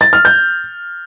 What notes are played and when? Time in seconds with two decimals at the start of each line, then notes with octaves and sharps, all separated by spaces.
0.01 A6
0.13 F6
0.25 G6